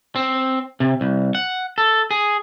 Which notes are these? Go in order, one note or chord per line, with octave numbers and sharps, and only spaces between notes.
C4
C3
C2
F#5
A4
G#4